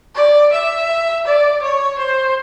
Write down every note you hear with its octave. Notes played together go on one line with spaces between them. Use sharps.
D5
E5
D5
C#5
C5